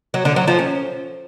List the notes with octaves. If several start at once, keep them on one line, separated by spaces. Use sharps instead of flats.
F#3
D3
F#3
F3
C#4